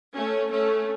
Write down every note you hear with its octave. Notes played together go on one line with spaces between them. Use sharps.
A3 C#4
A3 C#4